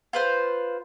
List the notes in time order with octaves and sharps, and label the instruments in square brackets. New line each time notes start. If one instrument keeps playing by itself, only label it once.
[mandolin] F4 B4 C5